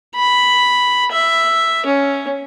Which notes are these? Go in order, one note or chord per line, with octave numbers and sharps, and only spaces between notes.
B5
E5
C#4